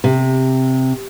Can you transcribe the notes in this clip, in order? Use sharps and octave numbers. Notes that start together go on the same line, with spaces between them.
C3